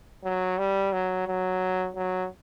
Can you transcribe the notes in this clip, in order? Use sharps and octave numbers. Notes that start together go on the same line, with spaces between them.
F#3
G3
F#3
F#3
F#3